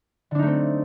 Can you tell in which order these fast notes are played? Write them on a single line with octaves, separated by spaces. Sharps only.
D3 D4 D#4 A3 C4